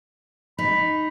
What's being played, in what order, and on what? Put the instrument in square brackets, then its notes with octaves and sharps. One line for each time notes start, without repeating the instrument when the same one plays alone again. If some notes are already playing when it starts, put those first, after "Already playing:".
[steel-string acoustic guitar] D#4 [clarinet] B5